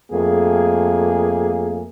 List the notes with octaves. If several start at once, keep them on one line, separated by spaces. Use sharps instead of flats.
F2 A3 A#3 G#4